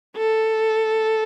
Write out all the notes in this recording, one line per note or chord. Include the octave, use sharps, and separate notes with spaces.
A4